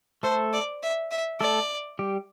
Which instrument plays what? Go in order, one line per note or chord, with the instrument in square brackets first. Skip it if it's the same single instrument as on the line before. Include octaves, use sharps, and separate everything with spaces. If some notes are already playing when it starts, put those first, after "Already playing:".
[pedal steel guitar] A3 A4 [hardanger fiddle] C5
[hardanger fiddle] D5
E5
E5
[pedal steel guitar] A3 A4 [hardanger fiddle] D5
[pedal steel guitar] G3 G4